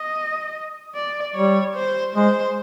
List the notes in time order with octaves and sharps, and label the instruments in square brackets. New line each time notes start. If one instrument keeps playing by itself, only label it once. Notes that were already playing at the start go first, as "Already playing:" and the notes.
Already playing: [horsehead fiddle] D#5
D5
[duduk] G3 [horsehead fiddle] C#5
[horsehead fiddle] C5
[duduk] G#3 [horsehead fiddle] C5